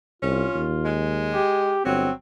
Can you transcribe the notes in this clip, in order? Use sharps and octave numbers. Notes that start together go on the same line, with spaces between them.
C2 C#4 F4
D#2
G#3
G4
G1 F#3 C4